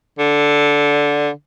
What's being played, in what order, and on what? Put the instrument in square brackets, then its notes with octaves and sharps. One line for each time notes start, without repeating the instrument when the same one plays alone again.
[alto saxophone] D3